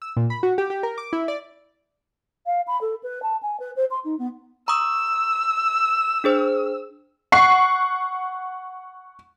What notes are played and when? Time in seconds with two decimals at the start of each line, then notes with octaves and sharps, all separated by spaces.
0.02 E6
0.17 A#2
0.30 B5
0.43 F#4
0.58 G4
0.70 G4
0.83 A#4
0.98 D6
1.13 E4
1.28 D5
2.46 F5
2.67 B5
2.81 A4
3.03 B4
3.22 A5
3.42 G#5
3.60 B4
3.76 C5
3.91 C6
4.04 D#4
4.19 B3
4.68 A#5 C#6 D#6 E6
6.24 D4 G#4 C5
7.32 F#5 C#6 C7